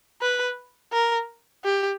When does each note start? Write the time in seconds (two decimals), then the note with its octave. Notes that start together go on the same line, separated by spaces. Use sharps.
0.22 B4
0.93 A#4
1.64 G4